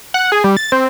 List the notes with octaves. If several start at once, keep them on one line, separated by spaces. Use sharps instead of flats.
F#5
G#4
G3
A6
C4